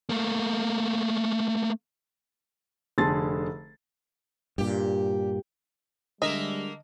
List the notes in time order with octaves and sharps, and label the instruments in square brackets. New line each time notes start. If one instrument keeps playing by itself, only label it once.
[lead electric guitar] A3 A#3
[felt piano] F1 D3 G#4 A5 C6 A6
[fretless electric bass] G2 A#2 [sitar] G4
[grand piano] D3 [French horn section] G3 G#3 [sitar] A#3 A#4 E5 [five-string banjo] D#5